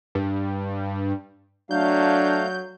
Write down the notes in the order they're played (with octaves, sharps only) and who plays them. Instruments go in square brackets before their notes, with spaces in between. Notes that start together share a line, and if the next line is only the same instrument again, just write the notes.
[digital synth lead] G2
[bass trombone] F#3 [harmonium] A3 F5 [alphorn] D4 [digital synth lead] G6